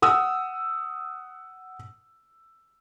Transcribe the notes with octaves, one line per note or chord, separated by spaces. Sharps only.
F#5 D#6 E6